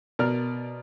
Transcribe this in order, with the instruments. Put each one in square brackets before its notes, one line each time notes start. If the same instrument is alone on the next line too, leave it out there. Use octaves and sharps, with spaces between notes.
[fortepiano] B2 A#4 D5 F6